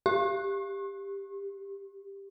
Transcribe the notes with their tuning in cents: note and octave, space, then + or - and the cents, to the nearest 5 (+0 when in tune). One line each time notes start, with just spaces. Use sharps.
G4 +15